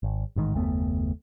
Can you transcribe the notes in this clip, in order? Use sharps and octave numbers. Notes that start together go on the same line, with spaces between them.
G#1
A1 G#2 D#3
F#1 D#2 A3 B3